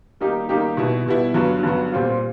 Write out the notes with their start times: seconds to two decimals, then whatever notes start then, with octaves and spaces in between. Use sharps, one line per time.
0.21 D#3 G3 A#3 D#4 G4
0.49 D#3 G3 A#3 D#4 G4
0.77 B2 G3 B3 E4
1.06 B2 G3 B3 E4
1.34 G2 D3 F#3 B3
1.63 G2 D3 F#3 B3
1.92 A#2 G3 C4 F4